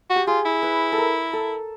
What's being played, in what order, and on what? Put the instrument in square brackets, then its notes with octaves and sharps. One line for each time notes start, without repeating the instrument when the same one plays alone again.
[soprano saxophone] F#4
[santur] G4
[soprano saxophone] F4 [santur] G#4
[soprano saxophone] E4
[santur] B4
A4
A#4
A4